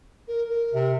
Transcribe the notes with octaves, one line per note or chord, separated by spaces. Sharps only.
A#4
A#4
C3